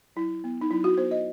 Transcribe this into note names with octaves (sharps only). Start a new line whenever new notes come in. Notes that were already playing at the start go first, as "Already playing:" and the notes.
F#3 E4
B3
D#4
F#3 E4
F#4
B3 C5
D#5